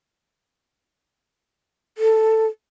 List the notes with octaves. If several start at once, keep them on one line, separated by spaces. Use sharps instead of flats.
A4